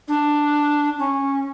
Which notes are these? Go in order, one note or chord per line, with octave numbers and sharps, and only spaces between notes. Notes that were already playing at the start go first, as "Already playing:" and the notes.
D4
C#4